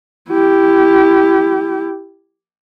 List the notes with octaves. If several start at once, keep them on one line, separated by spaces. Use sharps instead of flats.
E4 G4